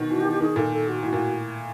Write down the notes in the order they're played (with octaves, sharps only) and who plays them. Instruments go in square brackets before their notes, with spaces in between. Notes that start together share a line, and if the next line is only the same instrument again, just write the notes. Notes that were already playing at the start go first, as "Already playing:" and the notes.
Already playing: [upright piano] B2 D#3
[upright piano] E3 [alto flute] F#4
[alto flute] G4
[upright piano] D#3
[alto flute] G4
[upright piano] D#3 [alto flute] G#4
[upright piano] A#2 [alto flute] A4
[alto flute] A4
F#4
[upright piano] A2 [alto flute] F#4
[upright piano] A#2